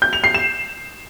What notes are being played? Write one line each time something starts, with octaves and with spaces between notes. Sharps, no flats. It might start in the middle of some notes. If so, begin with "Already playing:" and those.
G6
F7
C7
E7